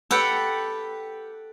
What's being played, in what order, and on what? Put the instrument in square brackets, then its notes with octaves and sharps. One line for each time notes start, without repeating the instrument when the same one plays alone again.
[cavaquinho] G4 B4 [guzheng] A4 F#5 G5